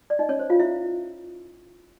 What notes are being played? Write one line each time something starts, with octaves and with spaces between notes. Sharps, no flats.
D5
D#4 D#5
C#4 C#5
C5
F4 F5
E4 E5